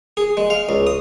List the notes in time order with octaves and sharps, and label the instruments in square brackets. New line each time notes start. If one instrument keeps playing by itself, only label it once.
[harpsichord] G#4
G#3
F5
C#2
D#6